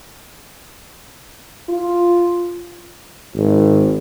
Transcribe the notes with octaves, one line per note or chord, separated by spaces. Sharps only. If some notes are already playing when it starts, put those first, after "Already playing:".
F4
G#1